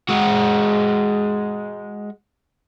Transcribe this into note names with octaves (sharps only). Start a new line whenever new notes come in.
G#3 F#4